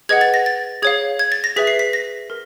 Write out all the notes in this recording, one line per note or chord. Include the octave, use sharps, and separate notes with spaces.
G#4 B4 D#5 F#5 G#6
A6
A#6
A6
G#4 C#5 F5 G#6
G#6
A6
A#6
G#4 B4 E5 B6
C7
B6
A#6
A#4